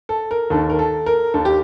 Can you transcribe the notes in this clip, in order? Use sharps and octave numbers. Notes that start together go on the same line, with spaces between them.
A4
A#4
D#2 D#3 A4
A#4
A4
A#4
D#2 D#3 A4
G4